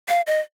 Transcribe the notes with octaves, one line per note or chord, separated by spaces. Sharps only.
F5
D#5